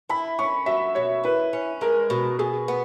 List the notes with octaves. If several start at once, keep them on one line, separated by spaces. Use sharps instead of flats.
E4 B5
C#4 C#6
F#3 E5
B2 C#5
E4 B4
C#4
G#3 A#4
B2
B2 G#4
B3